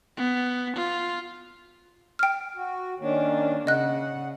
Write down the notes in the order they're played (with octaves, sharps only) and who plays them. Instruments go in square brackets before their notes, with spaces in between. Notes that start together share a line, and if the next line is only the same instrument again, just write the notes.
[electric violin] B3
F4
[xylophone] G5 F6
[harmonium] F#4
[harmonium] D#3 C#4 [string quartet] A#3 D4
[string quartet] C#3 [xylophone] D#5 F#6 [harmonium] F#5